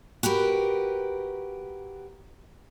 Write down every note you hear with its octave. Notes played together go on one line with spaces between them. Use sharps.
F#4 G4 A#4 B4